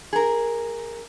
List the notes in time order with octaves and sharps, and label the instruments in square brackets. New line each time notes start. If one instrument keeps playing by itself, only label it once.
[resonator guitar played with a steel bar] G#4 A#4